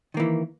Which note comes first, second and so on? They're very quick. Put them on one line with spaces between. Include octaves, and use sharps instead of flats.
D#3 A#3 E3